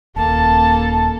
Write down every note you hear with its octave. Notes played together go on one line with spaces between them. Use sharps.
D#1 A#3 A4 A5